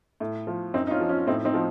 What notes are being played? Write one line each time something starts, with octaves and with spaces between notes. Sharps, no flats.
A2
F3
F#2 C4 D#4
D#4
C#4 F4
F3
C#4 F4
A2 C4 D#4
C4 D#4
F3